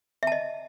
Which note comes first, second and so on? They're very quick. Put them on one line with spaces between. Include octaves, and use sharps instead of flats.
E5 A5 D#5